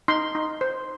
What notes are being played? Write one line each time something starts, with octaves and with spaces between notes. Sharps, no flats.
D#4 C6
D#4
C5